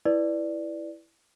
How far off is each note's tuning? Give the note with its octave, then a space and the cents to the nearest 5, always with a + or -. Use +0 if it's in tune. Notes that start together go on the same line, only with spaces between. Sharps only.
E4 +0 B4 +0 D5 +5